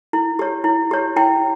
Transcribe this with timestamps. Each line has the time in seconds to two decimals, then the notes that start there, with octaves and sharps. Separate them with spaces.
0.13 E4
0.39 G4 C#5
0.64 E4
0.91 G4 C#5
1.16 E4 G5